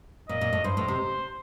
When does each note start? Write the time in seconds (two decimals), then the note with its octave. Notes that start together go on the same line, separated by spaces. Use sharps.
0.29 A#2 D#5
0.41 A#2
0.53 A2
0.64 G2 C5
0.77 A2
0.88 C3